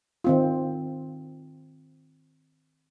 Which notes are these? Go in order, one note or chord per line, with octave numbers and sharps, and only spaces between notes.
D#3 C4 F4